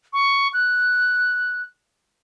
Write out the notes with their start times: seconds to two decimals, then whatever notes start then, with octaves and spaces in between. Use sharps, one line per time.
0.13 C#6
0.54 F#6